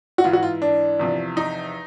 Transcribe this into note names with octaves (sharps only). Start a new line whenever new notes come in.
F#4
G#2 E3 F4
F#4
F4
D4
E2 C3 F3
D#4